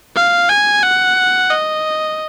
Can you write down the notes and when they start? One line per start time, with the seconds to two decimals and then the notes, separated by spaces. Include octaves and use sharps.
0.16 F5
0.49 G#5
0.83 F#5
1.50 D#5